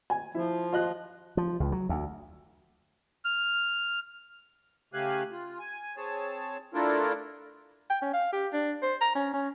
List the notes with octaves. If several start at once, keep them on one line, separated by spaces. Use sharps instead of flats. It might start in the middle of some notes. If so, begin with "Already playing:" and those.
G#5
F3 E4
F4 D#5 F#6
F3
C#2
F#3
D2
F6
C#3 A3 G4 F5 G#5 F#6
F4
G#5
C4 G#4 C#5 A5
A3 D4 E4 F4 A4 A#4
G5
C#4
F5
G4
D4
C5
A#5
C#4
C#4